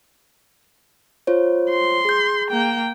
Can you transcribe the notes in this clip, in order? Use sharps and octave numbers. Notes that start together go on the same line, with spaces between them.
F4 C5 C#5
C6
G#4 G6
A#3 G5